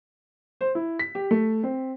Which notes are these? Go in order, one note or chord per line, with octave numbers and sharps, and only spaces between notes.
C5
E4
B6
G4
A3
C4